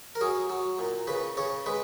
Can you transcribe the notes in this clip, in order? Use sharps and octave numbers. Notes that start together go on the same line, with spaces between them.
A#4
F#3 G#4
F#3
A#2
C#3 B4
C#3 C#5
G#3 B4